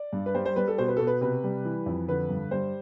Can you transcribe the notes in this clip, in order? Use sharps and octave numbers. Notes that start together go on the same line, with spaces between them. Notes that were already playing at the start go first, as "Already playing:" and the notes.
Already playing: D5
G2
B4
G3 C5
C5
G3 B4
A4
B2 C5
B4
B2 A4
B4
C3 B4
G3
E3
F2
D3 B4
G2
G3 C5